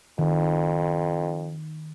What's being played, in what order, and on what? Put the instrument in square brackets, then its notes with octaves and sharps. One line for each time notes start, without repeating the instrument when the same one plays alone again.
[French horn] F2 [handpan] D#3